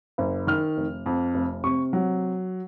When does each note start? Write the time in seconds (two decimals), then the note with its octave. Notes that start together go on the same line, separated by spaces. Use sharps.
0.18 F#1
0.47 D#3 F6
0.77 F1
1.06 F2
1.34 F1
1.64 C3 C#6
1.93 F#3